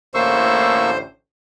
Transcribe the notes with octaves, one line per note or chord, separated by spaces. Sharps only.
A1 D2 A2 A#3 C5 C#6 E6